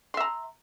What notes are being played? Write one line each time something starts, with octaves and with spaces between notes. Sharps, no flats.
E5 A#5 C6